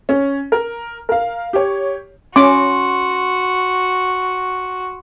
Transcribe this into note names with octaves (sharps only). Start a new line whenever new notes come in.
C#4
A#4
A#4 F5
G4 C#5
C#4 F#4 C6 D6